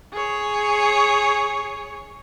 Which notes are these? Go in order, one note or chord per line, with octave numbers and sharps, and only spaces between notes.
G#4 C#5